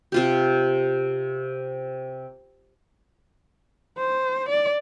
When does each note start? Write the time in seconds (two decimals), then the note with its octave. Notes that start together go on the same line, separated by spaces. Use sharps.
0.12 C3 F4 G4
3.98 C5
4.49 D5